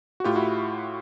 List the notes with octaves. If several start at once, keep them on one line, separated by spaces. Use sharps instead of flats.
F#4
A2 F4 G4
E4 F#4